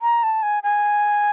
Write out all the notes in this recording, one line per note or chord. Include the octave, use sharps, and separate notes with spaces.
A#5
A5
G#5
G#5